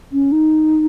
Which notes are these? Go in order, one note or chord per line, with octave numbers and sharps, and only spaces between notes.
C#4
D#4